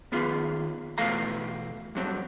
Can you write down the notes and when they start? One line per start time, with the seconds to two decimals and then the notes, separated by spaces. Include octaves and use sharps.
0.12 D#2 B3 F4 G#4
0.98 B2 E3 A3 A4 F5 A#5
1.95 G2 F#3 C4